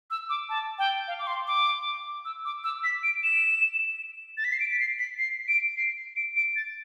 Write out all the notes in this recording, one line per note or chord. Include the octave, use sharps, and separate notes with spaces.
E6
D6
A5
G5
F5
D6
C6
D6
E6
D6
E6
B6
D7
E7
A6
B6
C7
D7
B6
C7
B6
C7
D7
C7
D7
D7
A6